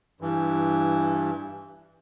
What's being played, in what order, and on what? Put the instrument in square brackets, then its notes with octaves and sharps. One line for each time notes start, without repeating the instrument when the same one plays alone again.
[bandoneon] G2 E3